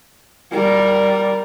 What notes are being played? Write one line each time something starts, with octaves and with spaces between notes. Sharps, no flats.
G3 A#4